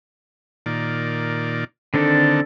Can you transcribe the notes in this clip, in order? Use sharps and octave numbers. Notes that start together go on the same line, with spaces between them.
A#2 D#3 D5
D3 D#3 C4 D4 A4